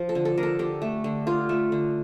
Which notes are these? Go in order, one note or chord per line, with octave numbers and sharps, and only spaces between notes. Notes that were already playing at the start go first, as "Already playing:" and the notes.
Already playing: F3
A4
D3
A4
D3 A#4
A4
D3 G4
A3
D3
D3 F4
A3
D3